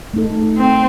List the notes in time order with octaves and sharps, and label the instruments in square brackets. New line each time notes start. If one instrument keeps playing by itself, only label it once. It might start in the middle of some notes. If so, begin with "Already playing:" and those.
[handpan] A3 D#4 A4
[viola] C4